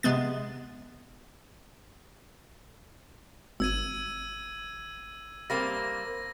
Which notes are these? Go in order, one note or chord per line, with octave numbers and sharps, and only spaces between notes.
C3 G#3 B3 A6
G#1 E6 G#6 D#7
G3 A#3 C4 A#6